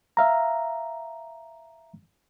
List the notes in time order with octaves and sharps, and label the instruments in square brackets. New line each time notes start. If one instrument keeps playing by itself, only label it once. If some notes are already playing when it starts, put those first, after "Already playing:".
[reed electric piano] E5 F5 A#5